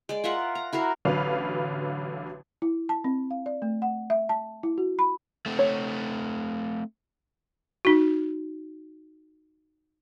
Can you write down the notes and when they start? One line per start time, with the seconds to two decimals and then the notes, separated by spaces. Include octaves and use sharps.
0.09 G#3 D5
0.24 F4 A#4 E5 F#5
0.55 A#5
0.73 E4 F#4 A#4 F5
1.05 A1 D3 F#3 B4 F5
2.62 E4
2.89 A5
3.04 C4
3.31 F5
3.46 D5
3.62 A3
3.82 F#5
4.10 E5
4.29 A5
4.63 E4
4.78 F#4
4.99 B5
5.46 A3 C4
5.59 C#5
7.85 D#4 F#4